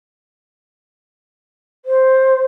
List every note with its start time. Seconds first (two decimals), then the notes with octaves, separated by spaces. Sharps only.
1.85 C5